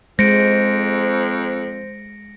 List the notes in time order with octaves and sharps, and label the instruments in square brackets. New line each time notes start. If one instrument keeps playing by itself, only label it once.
[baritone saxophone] F2 [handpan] G#3 [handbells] C5 [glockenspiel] A#6 C#7 D7